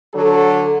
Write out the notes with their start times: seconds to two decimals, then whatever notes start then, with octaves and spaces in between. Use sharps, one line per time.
0.14 D3 F#3 A4